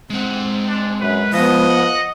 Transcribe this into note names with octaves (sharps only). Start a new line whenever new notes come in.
G#3 C4 F#5
D4
F#2 B4
F3 B3 D#5
F#5